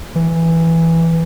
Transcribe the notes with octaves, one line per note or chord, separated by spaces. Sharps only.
E3